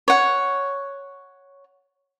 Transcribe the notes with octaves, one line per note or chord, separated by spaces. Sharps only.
C#5 F#5